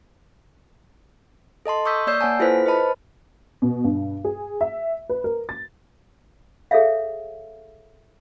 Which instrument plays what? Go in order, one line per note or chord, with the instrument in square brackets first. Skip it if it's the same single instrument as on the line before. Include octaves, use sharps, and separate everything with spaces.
[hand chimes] A4 D#5 A5 C6
C#6 D#6 E6 G6 B6
A#3 C#5 D5 E6 G6 C7
A#3 C#5 F#5 G#5 A5
E4 F4 A4 B4 C5 B6
B4 C5 D#5 A5 B5
[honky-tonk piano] B2
G2
G#4
E5
B4
A#4
A6
[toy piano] G#4 A4 C#5 E5 F5